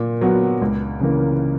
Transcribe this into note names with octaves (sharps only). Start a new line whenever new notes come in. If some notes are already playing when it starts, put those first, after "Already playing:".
Already playing: A#2
F#3 B3 F#4
C#2
C#3 E3 A#3